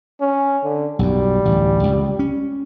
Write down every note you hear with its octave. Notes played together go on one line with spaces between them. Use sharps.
C#4
D3
B1 F#2 G3
A1 D2
C#2
C#4